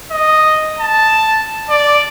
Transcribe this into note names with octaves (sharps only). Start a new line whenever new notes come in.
D#5
A5
D5